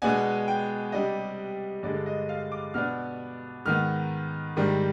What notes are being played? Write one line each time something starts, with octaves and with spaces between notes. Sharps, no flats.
B2 G#3 B3 D4 G#5
G5
C3 G3 D4 D#5
G2 D3 G#3 D5
D#5
F5
D6
B2 B3 D4 F6
G#2 D#3 B3 F6
G#2 D#3 G3 D4